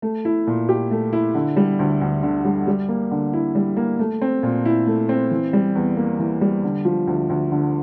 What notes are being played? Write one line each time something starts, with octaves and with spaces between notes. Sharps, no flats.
A3
E4
A#2
G4
A3
E4
D3
G3
D2
D2
D3
G3
G3
A#3
D3
E4
G3
A#3
A3
C4
A#2
E4
A3
C4
E3
G3
E2
A#3
E3
G3
D3
F3
D2
D2
D3